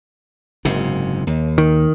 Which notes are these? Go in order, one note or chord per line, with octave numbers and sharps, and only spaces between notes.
F#1 G#2 C3
D#2
D#3